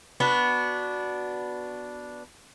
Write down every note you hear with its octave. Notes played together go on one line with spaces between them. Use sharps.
B3 D4 F#4